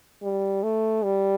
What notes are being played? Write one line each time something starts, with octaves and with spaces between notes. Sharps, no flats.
G3
A3
G3